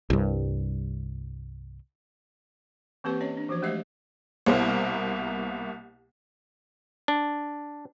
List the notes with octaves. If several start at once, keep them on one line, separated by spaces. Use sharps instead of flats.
C2 G2
E3 A#3 C4 G4 B4 C#6
C#4 C#5 D#5
D4
E3 F3 F#4 C5
G#3 A3 G4 C5 D#5 E5
C2 B2 A#3 E4 C5
D4